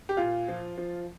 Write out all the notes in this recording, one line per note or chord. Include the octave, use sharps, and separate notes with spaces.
G4
A#2 F4
F3
F3